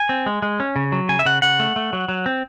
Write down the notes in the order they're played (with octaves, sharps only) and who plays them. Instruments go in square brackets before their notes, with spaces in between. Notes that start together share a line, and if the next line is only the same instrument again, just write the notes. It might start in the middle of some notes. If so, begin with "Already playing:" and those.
Already playing: [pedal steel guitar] G#5
C4
G#3
G#3
C#4
C#3
F#3
C#3 G#5
E5
C#3 F#5
C#3 F#5
A3
A3
F#3
F#3
C4